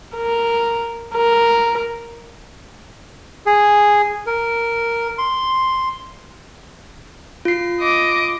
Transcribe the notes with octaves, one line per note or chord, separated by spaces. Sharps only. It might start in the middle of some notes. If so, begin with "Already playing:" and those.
A#4
A#4
G#4
A#4
C6
F4 C7
D#5 D6